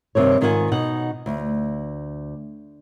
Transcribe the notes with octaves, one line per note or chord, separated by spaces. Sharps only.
G2 C3 D#3 C#5
G#2 D#3 F4 F#4 F#5 G#5
B2 D#4 F#5
D2